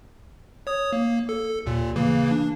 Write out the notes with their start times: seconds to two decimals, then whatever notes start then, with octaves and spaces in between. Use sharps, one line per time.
0.67 C#5 D#6
0.93 A#3
1.29 A4
1.66 D#2 A#2
1.96 C#3 E3 A#3
2.31 D4